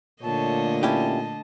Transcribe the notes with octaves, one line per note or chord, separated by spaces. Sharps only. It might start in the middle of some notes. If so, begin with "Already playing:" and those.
A#2 D3 A3 C#5 D#5 A5
C#4 E4 G4 A5